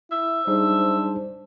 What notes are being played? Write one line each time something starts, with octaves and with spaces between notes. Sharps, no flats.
E4 E5
G3 D4 D#4 G#4 C5